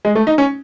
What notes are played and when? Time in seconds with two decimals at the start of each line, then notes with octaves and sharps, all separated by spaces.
0.05 G#3
0.15 A3
0.27 D#4
0.38 C#4